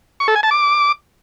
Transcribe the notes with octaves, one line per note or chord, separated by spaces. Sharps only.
C#6
A4
G#5
A5
D6